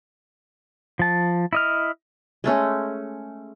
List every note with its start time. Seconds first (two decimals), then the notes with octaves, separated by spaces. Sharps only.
0.99 F3 A5
1.53 E4 D#5 F6
2.44 G#3 A3 C#4